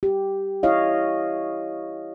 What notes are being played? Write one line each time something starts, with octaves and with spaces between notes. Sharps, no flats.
G4
E4 C#5 D#5 F5